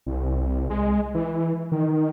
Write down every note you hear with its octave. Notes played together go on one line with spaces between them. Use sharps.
C2
G#3
E3
D#3